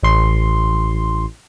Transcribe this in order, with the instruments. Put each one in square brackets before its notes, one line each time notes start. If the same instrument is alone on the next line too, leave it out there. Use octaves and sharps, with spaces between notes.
[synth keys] A1 C6